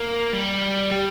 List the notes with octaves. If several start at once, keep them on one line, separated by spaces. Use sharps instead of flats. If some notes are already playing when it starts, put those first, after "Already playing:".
Already playing: A#3
G3
G3